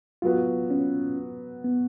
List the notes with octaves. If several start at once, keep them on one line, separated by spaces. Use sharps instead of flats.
F#3 B3 F4 F#4
C#4
B3